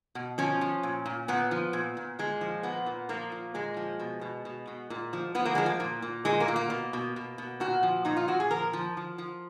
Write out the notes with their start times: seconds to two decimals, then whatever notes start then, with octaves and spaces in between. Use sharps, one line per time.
0.15 B2
0.38 F3 C#4
0.61 F3
0.83 A#2
1.06 A#2
1.28 A#2 B3
1.51 F3
1.73 A#2
1.97 A#2
2.19 A#2 G#3
2.41 F3
2.63 A#2 B3
2.86 A#2
3.09 F3 A#3
3.32 A#2
3.54 A#2 G#3
3.77 F3
4.00 B2
4.21 B2
4.45 B2
4.67 B2
4.90 A#2
5.13 F3
5.35 F3 B3
5.45 A#3
5.55 F3 G#3
5.66 A#3
5.80 A#2
6.02 A#2
6.25 A#2 G#3
6.40 A#3
6.48 A#2
6.56 A#3
6.70 B2
6.93 B2
7.16 B2
7.38 B2
7.60 A#2 F#4
7.83 F3
8.05 A#2 D#4
8.17 F4
8.28 A#2 F#4
8.40 G#4
8.51 F3 A#4
8.73 F3
8.97 F3
9.18 F3